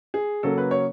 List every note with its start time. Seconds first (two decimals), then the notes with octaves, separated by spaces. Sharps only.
0.14 G#4
0.43 C#3 F#3 A#3 A4
0.58 B4
0.71 C#5